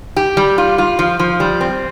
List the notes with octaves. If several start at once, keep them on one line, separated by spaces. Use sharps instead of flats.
G4
G3
F4
F4
F3
F3
G3
C4